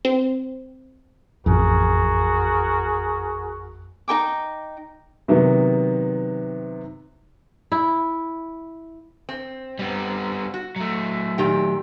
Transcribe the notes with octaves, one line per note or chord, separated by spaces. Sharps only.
C4
A1 F2 F#4 G#4 A#4
D#4 A#4 G5 D6
C3 D#3 F#3 B3
E4
C4
G3 B3
F#4
F#3 A3
A#2 D#3 G4